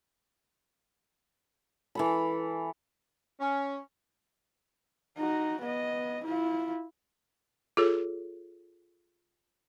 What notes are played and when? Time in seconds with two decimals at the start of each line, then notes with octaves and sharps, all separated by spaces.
1.95 E3 A4 B5
3.39 C#4
5.18 D#4 F#4
5.62 B3 D#5
6.24 E4 F4
7.77 F4 G#4 A4 C#5